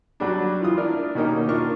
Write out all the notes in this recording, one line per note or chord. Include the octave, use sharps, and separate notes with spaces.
F#3 G3 D4
E3 F4 D#6
D4 E4 A#4 D5
B2 D#3 A#3 C#4 D#4 G4
D4 F4 A#4 D#5 C#6